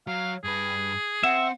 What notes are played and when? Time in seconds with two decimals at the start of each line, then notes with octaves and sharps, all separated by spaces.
0.07 F#3 F5
0.44 G2 G#4 B4
1.23 C4 E5 F#5